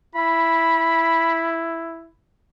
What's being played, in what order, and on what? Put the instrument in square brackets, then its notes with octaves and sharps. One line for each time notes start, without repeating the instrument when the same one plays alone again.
[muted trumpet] E4 [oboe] B5